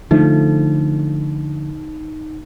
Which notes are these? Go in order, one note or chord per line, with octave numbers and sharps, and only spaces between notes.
D3 F3 A3 D#4